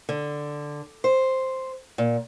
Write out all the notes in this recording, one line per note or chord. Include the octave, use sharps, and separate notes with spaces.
D3
C5
A#2